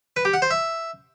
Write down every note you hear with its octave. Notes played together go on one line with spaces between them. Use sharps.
B4
G4
F#5
C5
E5